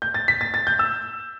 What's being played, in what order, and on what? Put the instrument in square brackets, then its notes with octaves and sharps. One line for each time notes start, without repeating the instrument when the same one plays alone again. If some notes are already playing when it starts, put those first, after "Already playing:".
[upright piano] G6
A6
B6
A6
A6
G6
E6